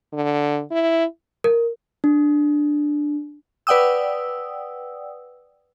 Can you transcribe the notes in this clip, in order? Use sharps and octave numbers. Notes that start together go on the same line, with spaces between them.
D3
E4
A#4
D4
B4 D5 F#5 G5 D#6 E6